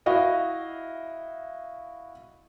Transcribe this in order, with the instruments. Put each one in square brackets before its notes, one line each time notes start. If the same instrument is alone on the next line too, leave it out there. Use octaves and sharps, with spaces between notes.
[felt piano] E4 F#4 D#5 F5